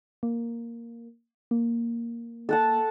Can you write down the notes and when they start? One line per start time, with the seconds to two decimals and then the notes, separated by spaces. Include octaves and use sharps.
0.23 A#3
1.51 A#3
2.49 A4 F#5 A5